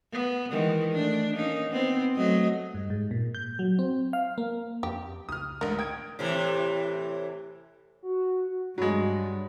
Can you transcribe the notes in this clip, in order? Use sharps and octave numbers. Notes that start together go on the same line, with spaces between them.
B3
D#3 E3 G#3
A3 D4
A#3 C#4 D#4
B3 C4
F#3 A3 D#5
G2
G#2
A#2
G6
F#3
C4
F5
A#3
F2 G4
C#2 D#6 F6
A1 G#2 D3 A#4
G5 D#6 G#6 D7
A2 C3 E3
F#4
G2 F#3 G#3 C#5 B5